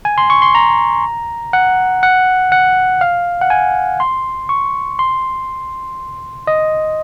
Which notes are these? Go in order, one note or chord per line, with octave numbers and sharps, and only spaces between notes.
G#5
C6
C#6
C6
A#5
F#5
F#5
F#5
F5
F#5
G#5
C6
C#6
C6
D#5